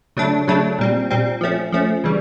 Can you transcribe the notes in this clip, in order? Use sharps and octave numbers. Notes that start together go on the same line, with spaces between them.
C#3 F#3 A3 D4
C#3 F#3 A3 D4
A#2 G3 C4
A#2 G3 C4
F3 A3 C#4
F3 A3 C#4
C#3 E3 G3